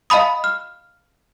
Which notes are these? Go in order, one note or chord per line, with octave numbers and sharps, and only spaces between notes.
D#5 F5 A5 B5 D#6
F6